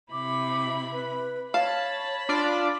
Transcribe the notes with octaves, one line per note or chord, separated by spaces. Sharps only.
C3 E4 B5 D6
B4
C#5 F5 A5 B5
D4 F4 D5